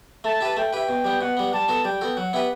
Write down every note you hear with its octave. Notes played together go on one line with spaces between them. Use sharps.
A3 A5
E4 G4 B4
A3 G5
E4 G4 B4
B2
G3 B3
B2 F#5
G3 B3
G3 A5
B3 F#4 A4
G3 G5
B3 F#4 A4
F#3 F#5
B3 E4 G4 B4